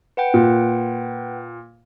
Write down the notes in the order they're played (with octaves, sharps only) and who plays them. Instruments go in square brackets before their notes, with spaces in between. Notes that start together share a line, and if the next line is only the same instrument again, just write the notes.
[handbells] B4 F#5 G5
[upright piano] A#2